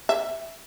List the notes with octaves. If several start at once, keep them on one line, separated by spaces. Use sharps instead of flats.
E5